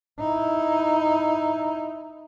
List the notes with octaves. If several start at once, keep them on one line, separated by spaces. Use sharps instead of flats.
D#4 E4